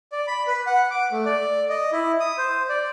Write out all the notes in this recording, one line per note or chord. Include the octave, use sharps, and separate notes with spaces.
D5
B5
B4
F#5
D6
A3
D5
D#5
E4
D#6
C5
D5